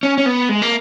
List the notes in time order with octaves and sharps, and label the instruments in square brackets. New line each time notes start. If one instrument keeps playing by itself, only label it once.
[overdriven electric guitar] C#4
C#4
B3
G#3
A#3